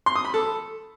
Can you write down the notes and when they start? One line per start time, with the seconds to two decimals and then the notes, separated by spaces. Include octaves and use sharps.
0.06 C6
0.16 D#6
0.25 B5
0.34 A4